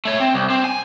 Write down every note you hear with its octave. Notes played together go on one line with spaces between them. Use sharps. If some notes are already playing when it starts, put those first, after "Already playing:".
A3 C#5
C4
C2
C4
G#5